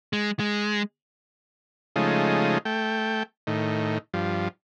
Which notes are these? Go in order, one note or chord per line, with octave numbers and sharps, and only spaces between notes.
G#3
G#3
C#3 F3 G#3 A3 D#4
A3 G5
A2 D#3
G2 F3